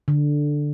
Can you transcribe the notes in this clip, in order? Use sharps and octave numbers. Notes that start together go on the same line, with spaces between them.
D3